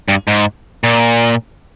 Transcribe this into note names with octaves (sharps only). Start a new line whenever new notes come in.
G2
G#2
A#2